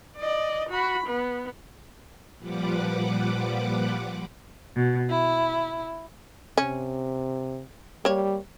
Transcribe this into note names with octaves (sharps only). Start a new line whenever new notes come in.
D5 D#5
F#4 B5
B3
A#2 F3 G3 B4 F#5 D6
B2
E4
C3 C#4
G3 A#3 C#5